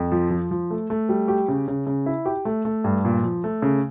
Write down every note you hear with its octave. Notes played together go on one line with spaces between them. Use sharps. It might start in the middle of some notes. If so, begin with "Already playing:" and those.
Already playing: F2
F3
F3
F3
A3
A3
G3
G4
C#3
C#3
C#3
E4
G4
A3
A3
G2
A#2
F3
A3
C#3